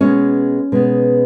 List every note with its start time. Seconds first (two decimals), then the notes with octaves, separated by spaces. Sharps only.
0.01 B2 G#3 B3 C#4 C#5
0.72 B2 G#3 B3